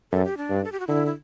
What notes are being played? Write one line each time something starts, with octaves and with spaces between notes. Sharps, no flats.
F#2 A4
G4
D4
G2
A4
G4
F#4
D3 E4
E4